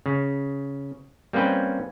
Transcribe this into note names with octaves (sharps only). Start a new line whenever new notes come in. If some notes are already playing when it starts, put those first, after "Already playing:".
C#3
G3 A#3 C4 C#4 B4 G5